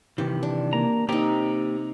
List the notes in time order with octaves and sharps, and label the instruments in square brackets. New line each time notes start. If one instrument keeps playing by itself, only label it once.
[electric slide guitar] C3 D#3 E3 [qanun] G4
[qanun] D4
[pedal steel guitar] A#3 A#5
[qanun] C3 D#4 [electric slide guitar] A#3 G4 G5 [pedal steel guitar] A#5